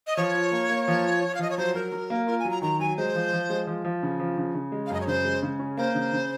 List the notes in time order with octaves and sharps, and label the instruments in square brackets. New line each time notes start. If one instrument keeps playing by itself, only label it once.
[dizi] D#5
[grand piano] F3 [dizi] C#5
[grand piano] F4
A#3
A#3
F3
F4
F4
[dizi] F5
[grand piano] F3 [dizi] D#5
[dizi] C#5
[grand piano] F#3 [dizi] C5
[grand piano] F#3 [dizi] A#4
[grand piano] F#3
A#3
[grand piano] F4 [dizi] A#4
[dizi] G#5
[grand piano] F#3
[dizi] A#5
[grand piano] D#3 [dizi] A#5
[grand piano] F#3 [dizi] G#5
[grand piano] G#3 [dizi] C5
[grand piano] F3
F3
G#3
F3
F3
C#3
F3
C#3
C#3
G#3
[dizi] F5
[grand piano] F#2 [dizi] D#5
[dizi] C#5
[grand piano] C#3 [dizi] C5
[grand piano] G#3
C#3
C#4
[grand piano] A#3 [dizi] C5
[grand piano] C#3
C#3